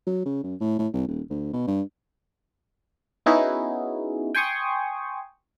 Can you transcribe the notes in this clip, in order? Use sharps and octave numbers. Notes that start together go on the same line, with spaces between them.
F#3
C#3
F#2
A2
A2
C2
D#1
D2
B2
G2
B3 C#4 D#4 E4 F#4 G#4
G5 G#5 C6 C#6 D#6